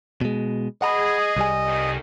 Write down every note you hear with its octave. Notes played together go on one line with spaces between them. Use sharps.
B2 G#3
G#4 D#5 F#5 A#5 B5
C2 G3 G#5
F2 D#3